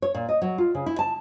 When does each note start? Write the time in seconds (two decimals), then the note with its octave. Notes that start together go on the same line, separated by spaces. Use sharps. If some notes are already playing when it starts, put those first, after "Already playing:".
0.02 C#5
0.15 A#2
0.29 D#5
0.42 F#3
0.58 F4
0.75 C#3
0.86 E4
0.99 A5